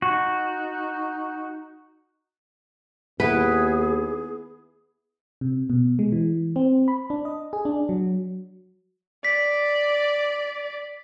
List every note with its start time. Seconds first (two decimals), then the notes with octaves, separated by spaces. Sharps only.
0.02 D#4 F#4
3.20 D#2 B3 E4 G#4 B4
5.41 C3
5.70 B2
5.99 G#3
6.12 E3
6.56 C4
6.88 B5
7.10 D4
7.25 D#5
7.53 G#4
7.65 D4
7.89 F#3
9.25 D5 B6